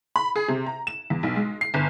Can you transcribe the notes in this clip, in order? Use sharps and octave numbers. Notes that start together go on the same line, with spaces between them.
B5
G#4
C3
A#5
E7
E2
B1
G#3
C7
G1